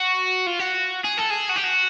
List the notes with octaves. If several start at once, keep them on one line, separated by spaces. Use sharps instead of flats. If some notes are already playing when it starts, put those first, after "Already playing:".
Already playing: F#4
F4
F#4
G#4
A4
G#4
F#4
G4
F#4